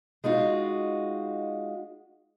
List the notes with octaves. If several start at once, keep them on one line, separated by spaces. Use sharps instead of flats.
G#3 D#4 F4 F#4